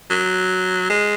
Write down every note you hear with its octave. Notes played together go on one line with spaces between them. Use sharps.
F#3
G#3